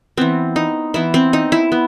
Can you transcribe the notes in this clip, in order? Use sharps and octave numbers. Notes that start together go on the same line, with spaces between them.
E3 B3 C4
D#4
E3 B3 E4
C4
D#4
E4
B3